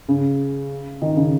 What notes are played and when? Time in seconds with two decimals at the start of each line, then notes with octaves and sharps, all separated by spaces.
0.08 C#3
1.02 D#3
1.16 C#3